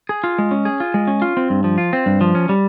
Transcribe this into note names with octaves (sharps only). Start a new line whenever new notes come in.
G#4
F4
G#3
C#4
G#4
F4
G#3
C#4
F4
C4
G2
F3
F4
C4
G2
F3
C#4
G3